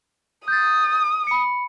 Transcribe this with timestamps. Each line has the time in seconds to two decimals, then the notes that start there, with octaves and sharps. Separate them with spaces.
0.48 D#6 G6 A6
1.27 B5 C#7